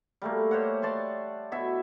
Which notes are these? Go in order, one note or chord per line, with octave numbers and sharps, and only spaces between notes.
G3 A3 A#3
G4 C5 C#5 F#5
D5 A5 C6 C#6
B2 E4 E5